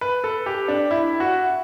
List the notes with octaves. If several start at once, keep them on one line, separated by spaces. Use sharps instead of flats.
B4
A4
G4
D4
E4
F#4